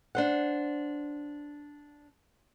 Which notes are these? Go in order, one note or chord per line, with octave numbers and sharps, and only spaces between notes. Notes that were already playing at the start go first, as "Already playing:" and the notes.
D4 C5 F#5